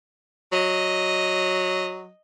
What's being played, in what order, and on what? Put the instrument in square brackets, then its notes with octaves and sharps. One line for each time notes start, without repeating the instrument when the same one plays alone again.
[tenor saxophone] F#3 [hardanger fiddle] D#5